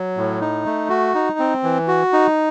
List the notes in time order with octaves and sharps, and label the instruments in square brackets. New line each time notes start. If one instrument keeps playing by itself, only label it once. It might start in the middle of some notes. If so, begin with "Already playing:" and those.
Already playing: [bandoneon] F#3
A2
D#4
A3
F#4
D#4
C4
E3
F#4
D#4